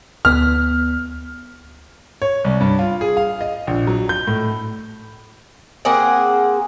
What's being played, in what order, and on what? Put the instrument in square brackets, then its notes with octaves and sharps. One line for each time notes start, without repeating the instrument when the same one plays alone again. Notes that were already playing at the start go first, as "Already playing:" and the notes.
[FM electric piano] D2 B3 [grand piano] F6
[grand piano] C#5
C2
G2
F4
G#4
F5
D#5
A#1
F#3
G6
A2
[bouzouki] A#3 C4 G#4 F#5